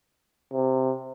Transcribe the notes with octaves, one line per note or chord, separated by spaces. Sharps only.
C3